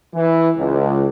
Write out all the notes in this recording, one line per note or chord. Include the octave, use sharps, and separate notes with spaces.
E3
C#2